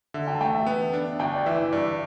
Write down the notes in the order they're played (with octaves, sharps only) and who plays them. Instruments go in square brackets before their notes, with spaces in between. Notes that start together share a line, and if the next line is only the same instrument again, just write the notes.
[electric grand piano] D3 [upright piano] E5
[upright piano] G5
A5
[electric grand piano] A3 [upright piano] G5
[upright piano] E5
[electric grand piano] B3
D4
[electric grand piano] G1 [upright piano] G5
[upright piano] D5
[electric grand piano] E3 [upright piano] E5
[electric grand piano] G2 [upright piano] D5